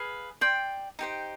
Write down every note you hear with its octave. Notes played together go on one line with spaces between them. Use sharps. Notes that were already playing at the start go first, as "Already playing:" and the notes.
Already playing: G#4 B4 F5
D5 G5 C6
D#4 G4 C5 G5